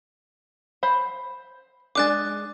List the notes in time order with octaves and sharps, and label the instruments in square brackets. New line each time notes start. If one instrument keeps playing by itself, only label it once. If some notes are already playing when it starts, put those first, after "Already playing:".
[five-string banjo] C5 B5
[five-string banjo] G#3 D4 G#4 [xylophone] D6 F#6 A6